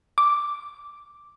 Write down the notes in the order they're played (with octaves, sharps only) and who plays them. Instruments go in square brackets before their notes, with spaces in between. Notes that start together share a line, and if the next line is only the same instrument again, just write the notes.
[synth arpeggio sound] D6